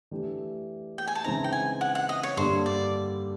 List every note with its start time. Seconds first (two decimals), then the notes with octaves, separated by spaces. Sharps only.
0.11 E3 A3 D4 G4
0.98 G5
1.07 G#5
1.15 A5
1.24 C#3 E3 G#3 C4 D#4 A#5
1.44 G5
1.53 G#5
1.81 F#5
1.95 F#5
2.09 D#5
2.23 C#5
2.37 G2 D3 G3 A#3 C5
2.66 D5